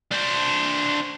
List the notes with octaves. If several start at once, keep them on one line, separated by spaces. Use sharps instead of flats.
D4 C5